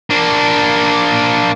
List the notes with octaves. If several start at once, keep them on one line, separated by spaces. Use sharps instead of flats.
A#3 D4